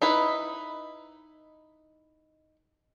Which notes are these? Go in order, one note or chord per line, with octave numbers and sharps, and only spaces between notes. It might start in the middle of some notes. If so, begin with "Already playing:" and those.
D#4 E4 B4